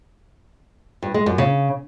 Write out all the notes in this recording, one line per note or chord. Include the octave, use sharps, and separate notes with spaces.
G2
G#3
F#2
C#3